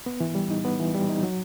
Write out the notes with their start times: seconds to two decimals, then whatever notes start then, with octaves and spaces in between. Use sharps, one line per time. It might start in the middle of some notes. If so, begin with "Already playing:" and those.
0.06 B3
0.20 E3
0.35 G3
0.51 D#4
0.65 B3
0.80 E3
0.94 G3
1.09 D#4
1.23 F#3